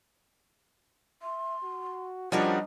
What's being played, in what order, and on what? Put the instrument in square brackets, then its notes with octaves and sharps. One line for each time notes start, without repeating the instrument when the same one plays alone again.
[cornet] E5 [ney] C6
[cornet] F#4
[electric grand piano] F3 G3 D4 [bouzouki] C#4 F#4 A#4 [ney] C5 [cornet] D#5